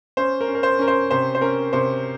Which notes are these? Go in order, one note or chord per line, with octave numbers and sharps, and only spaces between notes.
C#4 C5
A#4
C#4
A#4
C5
C#4 A#4
C5
C3 C5
C5
C#4 A#4
C3 C5